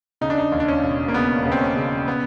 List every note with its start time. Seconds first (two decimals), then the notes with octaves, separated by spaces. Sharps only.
0.21 C#3 D#4
0.30 D4
0.38 D#4
0.52 D#2
0.60 D4
0.68 C#4
0.83 E1
1.08 A#3
1.14 C#3 B3
1.43 C#3 B3
1.52 C4
1.61 C#4
1.76 C#3
2.08 B3